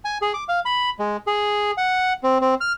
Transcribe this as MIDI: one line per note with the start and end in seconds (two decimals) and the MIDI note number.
0.05 0.18 80
0.22 0.33 68
0.34 0.44 86
0.48 0.60 77
0.65 0.90 83
0.99 1.17 56
1.27 1.71 68
1.77 2.13 78
2.23 2.38 60
2.41 2.55 60
2.61 2.73 89